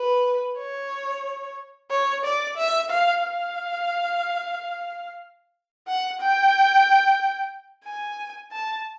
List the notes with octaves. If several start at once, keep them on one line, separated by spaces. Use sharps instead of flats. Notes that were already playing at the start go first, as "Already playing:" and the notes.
Already playing: B4
C#5
C#5
D5
E5
F5
F5
F#5
G5
G#5
A5